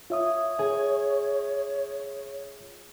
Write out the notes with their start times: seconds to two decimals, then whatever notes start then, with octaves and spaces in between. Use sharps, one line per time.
0.10 F4 C#5 E5 D#6
0.59 G#4